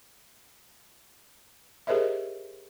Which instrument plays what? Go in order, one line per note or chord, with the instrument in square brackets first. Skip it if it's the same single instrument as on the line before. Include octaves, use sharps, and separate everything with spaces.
[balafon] G4 G#4 A#4 C5 D#5 E5